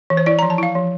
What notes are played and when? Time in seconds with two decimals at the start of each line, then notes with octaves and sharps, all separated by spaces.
0.10 E3
0.17 C5
0.26 E4 D5
0.39 A#5
0.43 F3
0.50 A5
0.58 E4 F5
0.75 F3